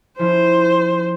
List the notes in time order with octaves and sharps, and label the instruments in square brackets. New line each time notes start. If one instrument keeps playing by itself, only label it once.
[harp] F3 C#4 E4 [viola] C5